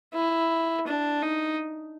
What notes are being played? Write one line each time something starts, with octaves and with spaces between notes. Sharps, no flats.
E4
D4
D#4